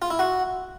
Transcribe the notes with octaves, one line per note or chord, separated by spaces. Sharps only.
F4
E4
F#4